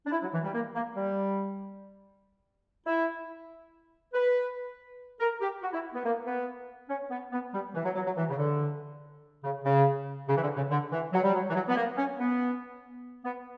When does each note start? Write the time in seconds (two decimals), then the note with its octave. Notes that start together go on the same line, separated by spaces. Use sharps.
0.07 D4
0.11 E4
0.22 F#3
0.33 E3
0.44 G3
0.54 A#3
0.76 A#3
0.96 G3
2.87 E4
4.14 B4
5.20 A#4
5.41 G4
5.63 F#4
5.73 E4
5.94 B3
6.05 A#3
6.26 B3
6.89 C#4
7.11 B3
7.32 B3
7.53 G3
7.75 E3
7.85 F#3
7.95 F#3
8.06 F#3
8.17 E3
8.30 C#3
8.37 D3
9.44 C#3
9.65 C#3
10.28 C#3
10.37 E3
10.42 D3
10.56 C#3
10.70 D3
10.92 E3
11.13 F#3
11.23 G3
11.34 F#3
11.50 E3
11.55 F#3
11.68 B3
11.76 A#3
11.98 C#4
12.19 B3
13.25 B3